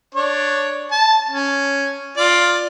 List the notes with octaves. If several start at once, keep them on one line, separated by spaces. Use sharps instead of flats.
D4 C#5
A5
C#4
F4 D5